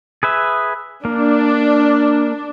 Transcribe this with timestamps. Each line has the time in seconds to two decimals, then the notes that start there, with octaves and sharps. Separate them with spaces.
0.23 G#4 B4 E5
1.05 A#3 D4